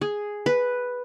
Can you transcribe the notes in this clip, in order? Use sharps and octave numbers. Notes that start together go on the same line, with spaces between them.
G#4
B4